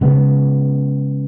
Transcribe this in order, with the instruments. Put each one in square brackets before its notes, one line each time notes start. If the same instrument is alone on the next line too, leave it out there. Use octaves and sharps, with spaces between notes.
[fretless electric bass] C#3 G#3 B3